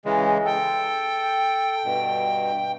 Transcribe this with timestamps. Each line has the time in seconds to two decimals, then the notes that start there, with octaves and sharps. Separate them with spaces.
0.05 C#3 E3 G#3
0.45 A4 G5
1.84 G2 B2